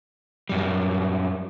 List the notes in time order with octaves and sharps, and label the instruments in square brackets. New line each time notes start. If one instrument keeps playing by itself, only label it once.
[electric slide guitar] F#2 G3